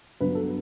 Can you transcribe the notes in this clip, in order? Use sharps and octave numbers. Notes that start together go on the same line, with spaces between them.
G2 F#3 B3 B4
A4